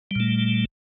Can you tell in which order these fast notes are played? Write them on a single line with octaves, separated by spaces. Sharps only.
G3 A#2 A3